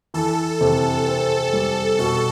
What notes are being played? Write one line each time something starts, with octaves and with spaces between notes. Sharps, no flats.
E3 A4
C3
C4
G3
B2 A4